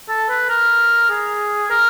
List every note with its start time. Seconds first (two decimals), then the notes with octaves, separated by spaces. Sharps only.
0.09 A4
0.29 B4
0.49 A#4
1.09 G#4
1.70 A#4